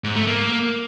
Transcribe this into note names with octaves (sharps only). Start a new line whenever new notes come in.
G#2
A3
A#3